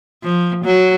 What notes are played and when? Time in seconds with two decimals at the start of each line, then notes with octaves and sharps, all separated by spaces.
0.23 F3
0.65 F#3